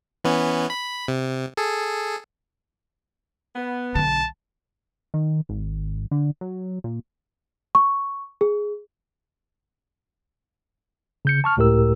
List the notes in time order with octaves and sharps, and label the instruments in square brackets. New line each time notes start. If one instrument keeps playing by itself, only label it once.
[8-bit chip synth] E3 B3 C#4
B5
C3
G#4 A4
[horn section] B3
[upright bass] B1 D3 [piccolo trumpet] A5
[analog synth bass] D#3
G#1
D3
F#3
A#2
[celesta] C#6
G#4
[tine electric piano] C#3 G6 C#7
A5 C#6 F6
C#2 A2 G4 A#4 E6